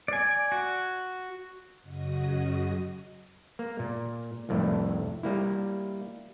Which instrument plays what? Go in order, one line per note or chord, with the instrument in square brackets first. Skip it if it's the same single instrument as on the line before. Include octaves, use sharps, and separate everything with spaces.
[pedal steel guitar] D5 G#5
F#4
[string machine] F#2 C#3 F#4 D#5 D#6
[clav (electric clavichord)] A#3
A#2
C2 F2 A2 A3
G3 A#3 E4